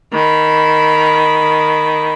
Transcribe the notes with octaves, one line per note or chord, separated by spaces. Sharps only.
D#3 B5